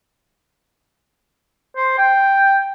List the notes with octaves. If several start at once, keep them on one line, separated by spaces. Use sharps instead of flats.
C5
G5